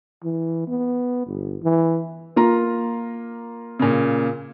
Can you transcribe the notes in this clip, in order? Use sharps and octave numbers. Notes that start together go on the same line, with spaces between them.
E3
B3
G1
E3
A#3 F4 A#5
A#2 C#3